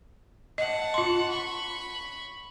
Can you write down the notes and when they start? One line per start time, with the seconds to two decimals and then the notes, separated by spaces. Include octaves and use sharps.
0.58 D#5 F#5 A5
0.94 F4 C6
1.29 B5 C#6